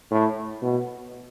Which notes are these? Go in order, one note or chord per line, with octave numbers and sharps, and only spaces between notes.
A2
B2